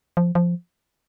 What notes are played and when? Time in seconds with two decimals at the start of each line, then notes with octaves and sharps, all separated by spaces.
0.17 F3
0.35 F3